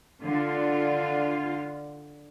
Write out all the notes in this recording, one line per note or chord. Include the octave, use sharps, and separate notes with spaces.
D3 F4